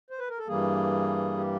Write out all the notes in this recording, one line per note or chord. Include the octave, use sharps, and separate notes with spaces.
C5
B4
A#4
A4
G2 E3 G3 A#3 G#4
G4